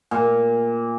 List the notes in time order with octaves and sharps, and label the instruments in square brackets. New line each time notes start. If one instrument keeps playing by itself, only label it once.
[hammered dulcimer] A#2